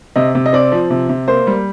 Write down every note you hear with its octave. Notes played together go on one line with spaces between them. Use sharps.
C3 D#5
C3
D#5
C4 D5
F3
C3
C3
A#3 C5
G3